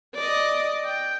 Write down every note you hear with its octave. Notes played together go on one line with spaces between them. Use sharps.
D5 D#5
G5